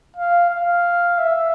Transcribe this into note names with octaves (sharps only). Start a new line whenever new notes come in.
F5
F5
E5